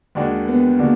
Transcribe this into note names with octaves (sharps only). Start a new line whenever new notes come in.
D#2 D#3 G#3 D4 F#4
B3
D#3 G#3 A#3 D4 F#4